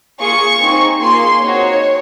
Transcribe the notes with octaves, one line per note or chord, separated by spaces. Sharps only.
A#3 F4 G#4 C#6
C4 D#4 G#4
A#3 F4 G#4 C6
C4 D#4 F#4 C#5